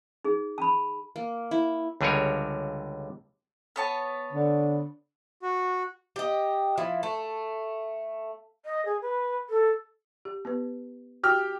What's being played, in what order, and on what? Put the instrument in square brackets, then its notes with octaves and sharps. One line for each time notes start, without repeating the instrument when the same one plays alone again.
[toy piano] D#4 G#4
A5 B5
[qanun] A#3
E4
[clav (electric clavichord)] C#2 D3 G3 G#4 A#4 C#5
[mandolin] B3 C#5 A5
[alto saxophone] D3
[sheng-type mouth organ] F#4
[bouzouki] G4 D#5
F3 E4
A3
[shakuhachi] D#5
G#4
B4
A4
[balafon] G4
B3 G4 B4
[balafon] F#4 [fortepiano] G4 F6